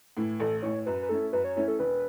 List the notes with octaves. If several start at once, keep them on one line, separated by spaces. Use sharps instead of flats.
A2 E3
A1 A4
A2 E3 C#5
F#2 B4
B4
E3 A3 C#4 E4 A4
F#2 B4
C#5
E3 A3 C#4 E4 C#5
A4
E1 B4